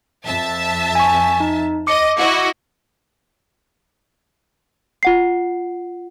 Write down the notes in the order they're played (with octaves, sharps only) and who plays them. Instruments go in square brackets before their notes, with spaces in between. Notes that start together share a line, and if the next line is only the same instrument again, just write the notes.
[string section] F2 E5 A5
[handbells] G#5 C#6
D#4
[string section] D#5 [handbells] D6 C#7
[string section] E4 F#4 D#5
[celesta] F4 F#5 C7